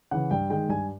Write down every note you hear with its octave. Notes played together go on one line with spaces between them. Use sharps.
C#3 E3 F#5
G2 G5
D#3 G#3 G5
G2 G#5